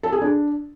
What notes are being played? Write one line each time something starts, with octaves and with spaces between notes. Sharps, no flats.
A4
G#4
D4